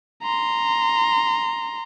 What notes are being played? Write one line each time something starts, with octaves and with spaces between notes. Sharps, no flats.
A#5 C6